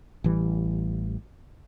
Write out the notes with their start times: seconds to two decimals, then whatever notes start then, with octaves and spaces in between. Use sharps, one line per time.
0.24 A1 E3 G3